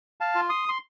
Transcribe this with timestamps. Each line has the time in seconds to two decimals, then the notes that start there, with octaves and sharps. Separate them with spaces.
0.21 F5 A5
0.35 F4
0.49 C6 D#6
0.69 C6